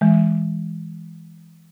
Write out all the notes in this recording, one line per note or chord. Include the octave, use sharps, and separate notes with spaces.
E3 G#3